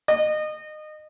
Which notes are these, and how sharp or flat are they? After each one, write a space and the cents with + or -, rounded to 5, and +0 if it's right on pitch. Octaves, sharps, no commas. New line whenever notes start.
D#5 -25